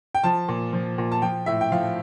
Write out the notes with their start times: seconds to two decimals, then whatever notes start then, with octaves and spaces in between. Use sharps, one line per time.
0.15 G5
0.24 F3 A5
0.48 A#2
0.73 F3
0.98 A#2
1.12 A5
1.22 F3 G5
1.46 A2 E5
1.61 G5
1.72 F3 F5